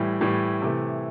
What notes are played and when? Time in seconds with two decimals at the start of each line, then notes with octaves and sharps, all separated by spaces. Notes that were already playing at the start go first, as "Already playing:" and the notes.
Already playing: A2 E3 G3
0.21 A2 E3 G3
0.62 C3 E3 A3